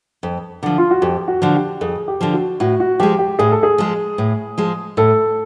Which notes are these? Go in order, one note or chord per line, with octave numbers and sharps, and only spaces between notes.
F2
D3 F3
F4
F#4
F2 G4
F#4
D3 F3
G4
F2 G#4
G4
D3 F3
F#4
A2 F#4
F#4
F3 G#3 G4
G4
A2 G#4
A4
G#4
F3 G#3
A2
F3 G#3
A2 A4